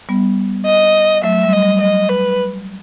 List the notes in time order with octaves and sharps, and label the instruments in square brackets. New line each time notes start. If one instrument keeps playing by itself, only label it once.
[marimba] G3 B3
[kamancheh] D#5
[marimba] F#3 A3 [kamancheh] E5
[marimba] G3
[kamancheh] D#5
[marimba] G3
[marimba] F#3 [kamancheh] D#5
[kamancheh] B4